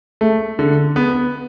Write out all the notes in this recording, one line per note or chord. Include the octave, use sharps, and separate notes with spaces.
A3
D3
B3